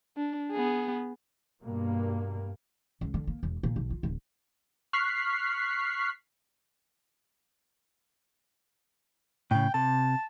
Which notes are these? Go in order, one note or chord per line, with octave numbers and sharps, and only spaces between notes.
D4
B3 G#4
G2 B2 A#3
C#2
D3
A#3
E1
A#2
B1
F4
D#1
C#6 F6 F#6 B6 C7
A2 C#3 G5
C3 A5